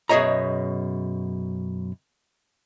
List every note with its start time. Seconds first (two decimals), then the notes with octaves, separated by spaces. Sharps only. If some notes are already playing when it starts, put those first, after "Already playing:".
0.09 F#2 B2 G#4 C#5 D#5 A#5